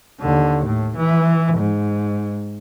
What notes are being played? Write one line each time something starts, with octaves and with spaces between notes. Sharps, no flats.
D#2 D3
A2
E3
G#2